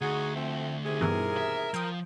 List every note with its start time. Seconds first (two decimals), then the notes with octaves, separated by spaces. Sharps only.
0.01 D2 D#4 F#4 G#4
0.36 F3 A3 C4
0.84 D#2 C3 G#4
1.01 G2 B2 E3 A#4
1.37 E5
1.74 F3 G5 D#6